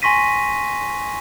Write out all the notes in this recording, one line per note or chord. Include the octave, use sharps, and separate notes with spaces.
G#5 C6 C#6 A#6 B6 D#7